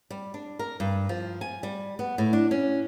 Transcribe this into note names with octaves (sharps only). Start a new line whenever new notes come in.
G3
D4
A#4
G2
F3
G#5
G3
B3
A2
D4
C#4